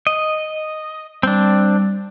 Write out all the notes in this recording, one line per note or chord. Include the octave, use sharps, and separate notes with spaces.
D#5
G3 C4 D4